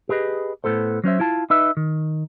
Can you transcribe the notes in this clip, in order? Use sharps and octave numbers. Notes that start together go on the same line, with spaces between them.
G4 G#4 B4 D#5
A2 B3 A4 C5
F#3 C#4 C5 E5
E4 F4 A5
D#4 B4 E5
D#3